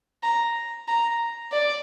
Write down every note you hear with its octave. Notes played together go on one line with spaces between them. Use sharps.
A#5
A#5
D5